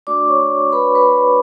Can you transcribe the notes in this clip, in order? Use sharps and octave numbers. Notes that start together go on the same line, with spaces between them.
A3 D4 F#4 D5 D6
C#5 C#6
B4 B5
B4 B5